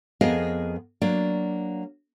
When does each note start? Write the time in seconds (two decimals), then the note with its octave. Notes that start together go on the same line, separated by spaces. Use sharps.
0.21 F2 B3 G#4 A#4 D#5 F5
1.02 F#3 A#3 D4 D5